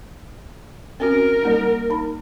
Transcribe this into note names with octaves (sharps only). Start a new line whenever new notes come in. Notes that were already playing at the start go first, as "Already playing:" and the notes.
C4 C#4 F#4 A#4
G3 A#3 D#4
D#4 B5